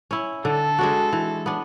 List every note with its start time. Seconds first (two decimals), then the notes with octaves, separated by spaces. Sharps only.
0.11 C#4 E4
0.45 D3 A4
0.78 G#3 D4 F#4
1.13 E3
1.46 B3 D4